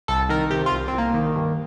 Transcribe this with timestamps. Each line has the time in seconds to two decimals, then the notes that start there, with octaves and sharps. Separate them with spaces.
0.08 C2 A4
0.29 D#3 A#4
0.51 C3 G4
0.66 F4
0.71 C2
0.88 C2 C4
0.98 A#3
1.14 D#3
1.36 G2